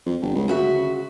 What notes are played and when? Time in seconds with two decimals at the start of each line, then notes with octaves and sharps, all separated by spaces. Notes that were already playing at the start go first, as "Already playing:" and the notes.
0.06 F2
0.21 G1
0.35 C#2
0.48 D2 C#3 F#4 E5